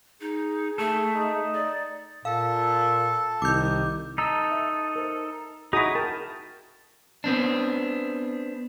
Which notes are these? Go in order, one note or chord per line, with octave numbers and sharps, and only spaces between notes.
D#4 G#4
A3 A4
D#4
D5
A#2 A4 F5
C2 D#3 D6 G6
D#4 A4 E6
E5
A#4 C5
D#4 E4 F#4 G#4 D#6
G#4 A#4 G5 A5
B3 C4 D4